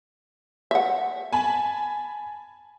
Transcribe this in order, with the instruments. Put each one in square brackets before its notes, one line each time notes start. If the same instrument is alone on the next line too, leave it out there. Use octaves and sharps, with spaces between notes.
[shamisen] E5 F#5
[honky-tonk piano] G#5 A5 B5